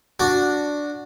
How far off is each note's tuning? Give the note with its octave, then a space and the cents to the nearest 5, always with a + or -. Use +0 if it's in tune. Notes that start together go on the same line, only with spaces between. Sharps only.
D4 +0 F#4 -10